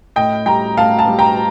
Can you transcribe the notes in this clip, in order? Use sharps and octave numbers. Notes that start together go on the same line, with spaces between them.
A2 D#5 G5
G3 G5 A#5
A2 F5 A5
F5 A5
G3
G5 A#5